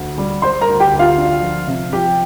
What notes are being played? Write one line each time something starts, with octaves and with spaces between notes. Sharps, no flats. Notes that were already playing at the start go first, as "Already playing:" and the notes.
Already playing: D2
G3
G3 C5 C6
A#4 A#5
D2
G4 G5
D2
F4 F5
D4
F3
C3
F3 G4 G5